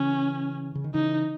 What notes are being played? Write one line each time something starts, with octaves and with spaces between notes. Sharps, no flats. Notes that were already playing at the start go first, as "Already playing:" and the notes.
Already playing: C#3 E3 C#4
C#3
D#3
C#3 E3 D#4